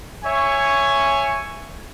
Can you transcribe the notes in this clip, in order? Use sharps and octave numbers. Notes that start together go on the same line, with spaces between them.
C#5 E5 G#5 C#6